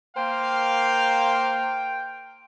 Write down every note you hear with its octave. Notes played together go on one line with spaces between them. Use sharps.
A#3 C5 F5 G5